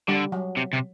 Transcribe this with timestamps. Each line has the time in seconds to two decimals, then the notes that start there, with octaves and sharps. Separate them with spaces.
0.08 D3 G3
0.32 F#3
0.57 C3
0.73 C3